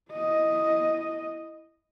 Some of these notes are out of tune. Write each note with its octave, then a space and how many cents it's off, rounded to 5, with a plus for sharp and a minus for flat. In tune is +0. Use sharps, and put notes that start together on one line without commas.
E4 -5 D#5 +0